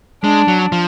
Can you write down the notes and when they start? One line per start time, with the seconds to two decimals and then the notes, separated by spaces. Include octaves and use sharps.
0.23 G#3 D4
0.48 F#3
0.72 F3